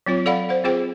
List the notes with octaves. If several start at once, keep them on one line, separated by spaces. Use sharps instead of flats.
F#3 C4 F4 C#5
A4 D5 F5 F#5 B5
C5 F#5
C4 F4 G#4 C5 G5